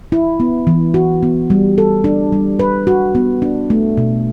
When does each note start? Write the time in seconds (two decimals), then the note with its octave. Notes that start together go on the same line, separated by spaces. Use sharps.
0.12 E4
0.40 B3
0.67 E3
0.94 F#4
1.23 B3
1.50 G3
1.78 A4
2.04 D4
2.32 G3
2.59 B4
2.87 F#4
3.15 B3
3.42 D4
3.70 A3
3.97 B2